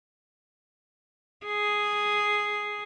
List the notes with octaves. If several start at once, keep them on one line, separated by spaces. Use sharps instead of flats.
G#4